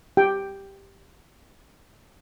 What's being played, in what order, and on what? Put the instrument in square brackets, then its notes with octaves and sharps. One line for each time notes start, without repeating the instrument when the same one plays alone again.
[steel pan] G4 G5